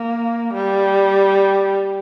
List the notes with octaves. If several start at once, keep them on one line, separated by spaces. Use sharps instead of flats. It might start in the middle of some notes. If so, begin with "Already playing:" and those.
Already playing: A#3
G3